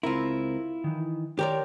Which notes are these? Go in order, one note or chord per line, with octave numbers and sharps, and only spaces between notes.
C#2 C4 E4 F4 A#4
D#3 E3
D#3 G4 A#4 C#5 D5 C6